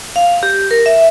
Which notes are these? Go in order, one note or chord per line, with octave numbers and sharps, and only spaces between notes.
F5
G4
A#4
E5